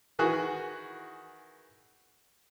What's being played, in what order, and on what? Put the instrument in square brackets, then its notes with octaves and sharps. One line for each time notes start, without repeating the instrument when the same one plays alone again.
[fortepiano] D#3 E3 F#4 G#4